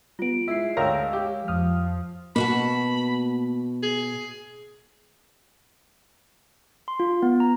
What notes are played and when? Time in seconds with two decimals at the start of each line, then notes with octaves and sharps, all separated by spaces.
0.19 G3 B3 F4 D7
0.48 G#3 E4 E5 C7
0.77 D2 A#4 C#5 F5 G5 A#5 E6
1.13 G4
1.48 F2 F3 D#6 F6
2.36 B2 A#3 F#4 A5 B5
3.83 G#4
6.88 C6
7.00 F4
7.23 B3
7.40 A#5